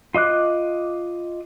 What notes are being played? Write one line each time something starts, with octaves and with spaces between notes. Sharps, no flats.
F4 D#5 D6 F#6